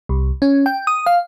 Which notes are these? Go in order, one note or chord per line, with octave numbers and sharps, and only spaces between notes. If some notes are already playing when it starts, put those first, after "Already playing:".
C2
C#4
G5
D#6
F5